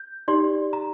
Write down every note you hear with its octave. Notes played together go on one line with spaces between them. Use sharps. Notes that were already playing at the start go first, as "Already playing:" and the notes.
Already playing: G6
D#4 G4 D5 C6
A#5